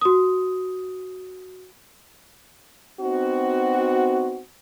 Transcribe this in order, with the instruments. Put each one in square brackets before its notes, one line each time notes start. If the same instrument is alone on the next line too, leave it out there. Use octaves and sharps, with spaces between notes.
[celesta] F#4 D#6
[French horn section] B3 C4 D#4 F#4